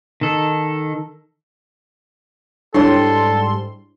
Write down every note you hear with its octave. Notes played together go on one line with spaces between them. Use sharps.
D#3 A4
G#2 G3 D4 E4 A4 C#5 C6